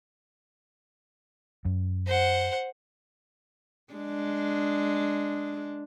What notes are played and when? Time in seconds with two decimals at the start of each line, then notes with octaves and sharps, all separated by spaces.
1.65 F#2
2.07 C5 F#5
3.93 G#3 D4